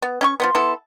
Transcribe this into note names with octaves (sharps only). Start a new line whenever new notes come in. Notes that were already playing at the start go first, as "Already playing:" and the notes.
B3
C#4 G5 C#6
F3 F#3 B3 C6
B3 E4 A4